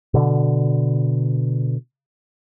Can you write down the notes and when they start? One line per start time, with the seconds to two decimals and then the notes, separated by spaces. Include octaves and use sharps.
0.14 B2 D3